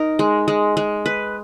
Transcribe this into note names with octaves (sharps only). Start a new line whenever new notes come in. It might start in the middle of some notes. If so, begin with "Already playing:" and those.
Already playing: D#4 A#4
G#3
G#3
G#3
B4